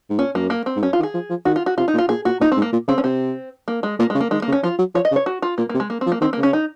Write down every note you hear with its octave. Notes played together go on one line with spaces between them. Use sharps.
G#2
A#2 C#4
F#2 A#3
A#3
C4
G#2
F#2 C#4
F4
D#3
G#4
F3
F3
D#3 F#4
F4
F#4
C3 F4
D#4
A#2
F4
A#2 G#4
A#2 F#4
A#2 D#4
C4
G#2
A#3
A#2
C#3 C4
C#4
C3 C4
A#3
G#3
A#2 A#3
G#3
C#3
A#3
D#3 G#3
A#3
C#3
C#4
F3 F4
F#3
F3 C#5
D#5
C#3
C#5
F#4
F4
A#2 A#3
A#3
C3
G#3
A#3
C4
F3
A#3
D#3 C4
A#3
C#3
C#4
D#4